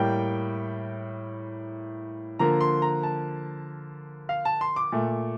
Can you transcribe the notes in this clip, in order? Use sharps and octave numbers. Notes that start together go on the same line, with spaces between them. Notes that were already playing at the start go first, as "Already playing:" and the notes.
Already playing: A2 G3 A#3 G5
D3 F3 A#3 A#5
C6
A#5
A5
F5
A5
C6
D6
A#2 A3